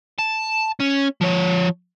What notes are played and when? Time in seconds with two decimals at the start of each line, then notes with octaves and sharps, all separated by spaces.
0.19 A5
0.80 C#4
1.21 F3 C#5